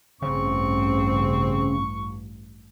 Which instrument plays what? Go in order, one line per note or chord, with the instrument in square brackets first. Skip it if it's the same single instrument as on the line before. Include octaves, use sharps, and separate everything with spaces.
[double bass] A1 G2 [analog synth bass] C#3 [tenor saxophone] C4 [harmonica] C#6